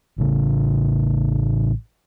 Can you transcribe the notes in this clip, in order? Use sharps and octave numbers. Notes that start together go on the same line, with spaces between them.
A1 C#3